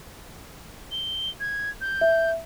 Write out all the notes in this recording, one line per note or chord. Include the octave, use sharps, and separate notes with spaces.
G7
G#6
G6
E5